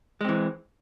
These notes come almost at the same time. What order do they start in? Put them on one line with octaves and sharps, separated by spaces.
G#3 C4 E3